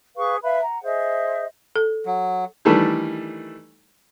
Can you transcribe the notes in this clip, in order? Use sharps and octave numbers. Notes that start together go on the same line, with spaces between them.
G#4 B4 F5 C#6
B4 E5 F5 B5
F#5 A#5
G#4 C5 D#5 E5
A4
F#3
D#3 E3 G3 A3 D4